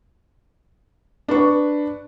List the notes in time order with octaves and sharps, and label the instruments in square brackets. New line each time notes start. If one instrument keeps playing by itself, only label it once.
[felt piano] D4 B4 C#6